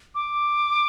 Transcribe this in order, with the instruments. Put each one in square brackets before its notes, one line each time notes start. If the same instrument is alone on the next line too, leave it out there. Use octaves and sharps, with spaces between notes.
[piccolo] D6